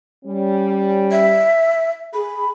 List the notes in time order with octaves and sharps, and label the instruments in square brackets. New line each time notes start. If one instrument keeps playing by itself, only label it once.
[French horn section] G3 C#4
[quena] E5
[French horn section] G#4 [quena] B5